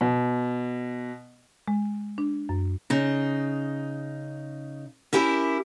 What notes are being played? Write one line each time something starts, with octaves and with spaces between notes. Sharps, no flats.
B2
G#3
D4
F#2
C#3 D#4
C#4 E4 G4 A#4 B4 E5